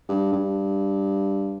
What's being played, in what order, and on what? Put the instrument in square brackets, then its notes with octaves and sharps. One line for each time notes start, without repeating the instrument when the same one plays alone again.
[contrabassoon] G2
G2